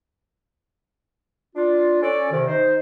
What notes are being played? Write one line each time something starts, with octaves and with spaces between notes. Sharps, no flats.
D4 F4
C#4 A4 D5
C3 D#3
D#4 C5